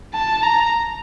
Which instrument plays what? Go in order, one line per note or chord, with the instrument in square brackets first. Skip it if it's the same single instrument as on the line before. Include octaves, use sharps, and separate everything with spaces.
[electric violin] A5
A#5